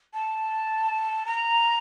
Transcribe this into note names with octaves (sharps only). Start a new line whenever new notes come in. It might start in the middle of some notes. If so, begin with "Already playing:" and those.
A5
A#5